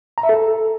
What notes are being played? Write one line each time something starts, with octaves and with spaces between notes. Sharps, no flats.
A#5
E5
A4